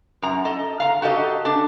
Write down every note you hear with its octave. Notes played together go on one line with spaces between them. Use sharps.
F#2 A#5
A4 D#5
F5 A#5
F#4 G4 A4 D#5
D4 A5